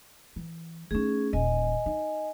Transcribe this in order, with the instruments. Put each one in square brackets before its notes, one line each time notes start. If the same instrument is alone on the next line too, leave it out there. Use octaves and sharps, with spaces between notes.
[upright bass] E3
[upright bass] A3 D#4 [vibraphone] C#4 G#4
[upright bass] D#1 E2 [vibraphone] D#5 G#5
[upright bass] D#4